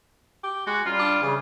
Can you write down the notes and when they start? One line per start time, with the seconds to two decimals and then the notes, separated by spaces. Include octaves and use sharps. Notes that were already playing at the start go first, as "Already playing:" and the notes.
0.44 G4
0.67 G#3 F#4
0.86 F#2 G3 F4
0.99 D4
1.22 C#3 E3